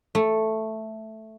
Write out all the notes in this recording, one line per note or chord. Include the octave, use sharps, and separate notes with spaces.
A3